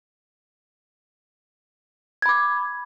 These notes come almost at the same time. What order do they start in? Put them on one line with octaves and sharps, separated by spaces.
G#6 B5 D6